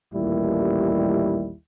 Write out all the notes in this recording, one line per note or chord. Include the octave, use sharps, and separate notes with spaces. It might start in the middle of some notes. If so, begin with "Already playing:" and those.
A1 D#2 A#2 G3 E4